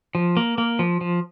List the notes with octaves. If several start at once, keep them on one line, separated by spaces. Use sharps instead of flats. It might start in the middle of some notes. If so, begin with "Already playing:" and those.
F3
A#3
A#3
F3
F3